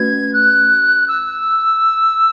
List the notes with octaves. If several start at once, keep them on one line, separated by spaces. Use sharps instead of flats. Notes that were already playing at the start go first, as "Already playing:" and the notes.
Already playing: A3 C#4 F#4 B4 G#6
F#6
E6